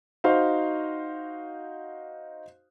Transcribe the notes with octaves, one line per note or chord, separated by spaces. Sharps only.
D#4 F#4 C5 F5